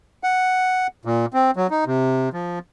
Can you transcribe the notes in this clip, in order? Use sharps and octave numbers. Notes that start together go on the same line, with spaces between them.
F#5
A#2
C4
F#3
D#4
C3
F3